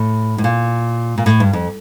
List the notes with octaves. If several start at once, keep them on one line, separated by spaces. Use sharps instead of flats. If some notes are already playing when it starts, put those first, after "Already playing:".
Already playing: A2
A2
A#2
A#2
A2
G2
F2